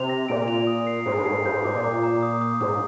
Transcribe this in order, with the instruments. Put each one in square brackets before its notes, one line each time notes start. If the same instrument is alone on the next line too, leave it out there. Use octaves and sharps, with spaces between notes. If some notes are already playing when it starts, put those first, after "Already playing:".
Already playing: [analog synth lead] C3 [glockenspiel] F7
[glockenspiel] A#6
[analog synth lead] A#2 [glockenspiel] D7
[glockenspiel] F7
D#6
C7
[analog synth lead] G#2 [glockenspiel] D#6
[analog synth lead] G2
[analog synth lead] G#2 [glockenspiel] C7
[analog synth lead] G2 [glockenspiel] G6
[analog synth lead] G#2
[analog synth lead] G#2 [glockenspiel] D6
[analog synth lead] A#2
[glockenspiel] D6
A#5
D#6
D#6
[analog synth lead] G#2 [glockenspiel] D#6